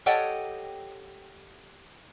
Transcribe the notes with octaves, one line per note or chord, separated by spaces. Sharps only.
G4 A4 C#5 D#5 F#5 G5